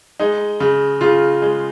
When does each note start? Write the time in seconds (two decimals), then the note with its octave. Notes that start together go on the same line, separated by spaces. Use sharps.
0.20 G#3 D#4
0.60 C#3
1.01 C#3 F4
1.42 G#3